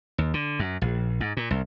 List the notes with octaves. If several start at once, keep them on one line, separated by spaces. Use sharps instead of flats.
D#2
D3
F#2
A#1
G#2
A#2
C2